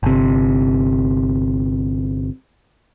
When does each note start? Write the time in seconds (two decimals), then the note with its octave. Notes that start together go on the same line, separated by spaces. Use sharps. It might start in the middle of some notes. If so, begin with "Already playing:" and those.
0.03 G1 C3